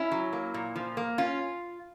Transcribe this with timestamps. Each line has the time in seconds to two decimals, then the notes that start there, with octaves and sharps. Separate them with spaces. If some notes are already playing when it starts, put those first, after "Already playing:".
Already playing: C#4 E4
0.12 F#3
0.33 A#3
0.54 A#2
0.76 F3
0.97 A#3
1.18 C#4 F4